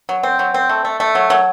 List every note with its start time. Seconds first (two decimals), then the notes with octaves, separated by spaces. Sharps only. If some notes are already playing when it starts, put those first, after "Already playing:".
0.09 F#3
0.23 C4
0.39 F#3
0.54 C4
0.69 A3
0.85 A3
1.00 A3
1.15 F#3
1.30 F#3